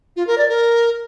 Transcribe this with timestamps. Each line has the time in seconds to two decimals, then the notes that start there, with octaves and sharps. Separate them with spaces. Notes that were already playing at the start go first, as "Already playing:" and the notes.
0.16 F4
0.27 A#4
0.38 D5
0.49 A#4